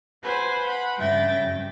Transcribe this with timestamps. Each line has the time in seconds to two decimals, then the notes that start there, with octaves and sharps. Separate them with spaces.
0.23 B4 C5 F#5 G#5
0.64 F#5 B5
0.98 G2 C#3 E5 G5 A6 A#6
1.39 G2